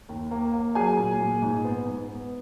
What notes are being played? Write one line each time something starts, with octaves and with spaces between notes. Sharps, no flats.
D#2
A#3
A#3
F#3 G#4 G#5
A#2
A#2
G#2
B3
G#2
B3